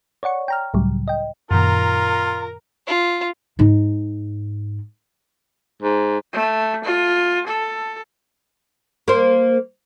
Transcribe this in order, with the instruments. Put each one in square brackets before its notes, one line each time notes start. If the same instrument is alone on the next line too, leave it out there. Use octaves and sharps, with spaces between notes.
[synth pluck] C#5 D5 F#5 C#6
G5 A#5 F6
C#2 A2 C#3 F#3 G3
D#5 G5
[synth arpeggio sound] F#2 A#2 D#3 [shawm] F4 [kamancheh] A#4 A#5
[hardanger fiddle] F4
[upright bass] G#2 D#4
[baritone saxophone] G#2
[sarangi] A3
F4
A4
[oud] A#3 C5